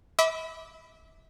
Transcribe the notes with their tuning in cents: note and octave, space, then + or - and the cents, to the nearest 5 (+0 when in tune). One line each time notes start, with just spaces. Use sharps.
E5 -35 B5 +15 D6 +0